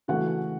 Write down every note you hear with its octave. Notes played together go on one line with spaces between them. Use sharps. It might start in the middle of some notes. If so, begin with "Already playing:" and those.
C#3 E3 A3 C#4 F#4 F#5